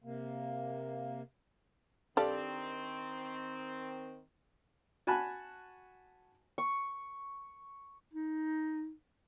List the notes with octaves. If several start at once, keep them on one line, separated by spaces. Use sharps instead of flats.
C3 A#3
D#3 C4 D4 G4 A4 D5 F5
F#4 G#5 A5 B5 F#6
C#6
D#4